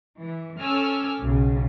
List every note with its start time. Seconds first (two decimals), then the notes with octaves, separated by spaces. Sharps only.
0.20 E3
0.61 C#4 A4 G#5 D6 E6 F6
1.20 B1 C#3